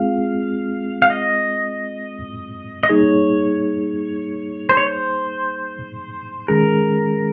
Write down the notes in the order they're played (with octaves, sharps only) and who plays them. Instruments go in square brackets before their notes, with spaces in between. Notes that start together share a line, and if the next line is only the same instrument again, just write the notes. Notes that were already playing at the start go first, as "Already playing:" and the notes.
Already playing: [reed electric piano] G#3 C4 F4 G#4 [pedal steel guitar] F5
[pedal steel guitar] F5
D#5
D#5
[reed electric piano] G3 A#3 D#4 G#4 [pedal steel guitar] C#5
[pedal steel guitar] C5
C#5
C5
[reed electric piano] D#3 G#3 C#4 G#4 [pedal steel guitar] A#4